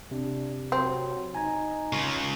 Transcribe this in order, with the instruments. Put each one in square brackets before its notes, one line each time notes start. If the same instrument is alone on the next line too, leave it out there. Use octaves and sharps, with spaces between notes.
[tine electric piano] C3 [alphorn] D4
[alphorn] F#3 [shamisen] C4
[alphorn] D#4 [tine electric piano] G#5 A#5 G#6
[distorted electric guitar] C#3 F4 [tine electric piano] C#6